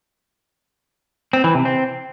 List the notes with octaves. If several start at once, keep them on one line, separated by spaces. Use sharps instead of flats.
C4
E3
C3
C4